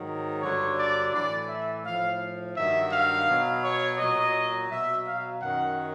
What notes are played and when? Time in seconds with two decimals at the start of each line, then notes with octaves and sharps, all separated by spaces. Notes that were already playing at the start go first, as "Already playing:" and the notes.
Already playing: G#2 D#3 F#3
0.42 G2 D3 F#3 C#5
0.78 D5
1.13 A2 E3 D5
1.49 E5
1.84 A2 F3 F5
2.56 G2 D#3 F#3 E5
2.92 F5
3.27 B2 F#3
3.62 C#5
3.98 A#2 F#3 D#5
4.70 B2 F#3 E5
5.05 F5
5.41 F#2 D#3 F#3 F#5